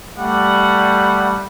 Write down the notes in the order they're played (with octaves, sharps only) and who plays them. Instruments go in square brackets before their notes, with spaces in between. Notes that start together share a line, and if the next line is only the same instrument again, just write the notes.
[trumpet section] G3 A3 D5 F#5